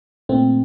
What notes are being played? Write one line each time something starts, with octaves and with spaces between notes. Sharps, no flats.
A#2 A3 C4